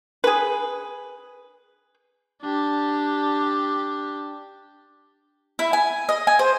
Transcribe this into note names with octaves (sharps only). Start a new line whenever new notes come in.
G#4 B4
D4 G4
E4
G#5
D#5
G#5
C5